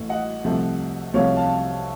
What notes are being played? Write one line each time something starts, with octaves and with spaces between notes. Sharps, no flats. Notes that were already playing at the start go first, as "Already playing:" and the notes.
Already playing: A1 A2 A3
D#5 F#5
C2 C3 F3 A3
C2 C3 F3 A3 C#5 F5
F5 A5